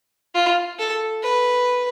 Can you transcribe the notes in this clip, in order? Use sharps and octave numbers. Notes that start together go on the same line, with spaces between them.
F4
A4
B4